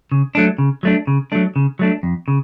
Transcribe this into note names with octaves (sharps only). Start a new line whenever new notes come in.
C#3
F#3 A3 D4
C#3
F#3 A3 D4
C#3
F#3 A3 D4
C#3
F#3 A3 D4
F2
C#3